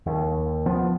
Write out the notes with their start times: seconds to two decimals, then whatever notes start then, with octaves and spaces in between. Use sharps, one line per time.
0.06 D#2
0.66 F3 B3